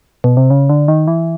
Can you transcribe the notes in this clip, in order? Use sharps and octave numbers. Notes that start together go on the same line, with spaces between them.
B2
C3
C#3
D3
D#3
E3